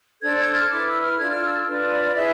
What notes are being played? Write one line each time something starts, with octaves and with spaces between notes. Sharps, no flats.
D4 A4 C5 G#6
G#6
F6
E4 B4 D6
E6
F6
D4 F4 A4 G#6
F6
E6
D4 F4 B4
D5
D5
E4 G#4 B4 E5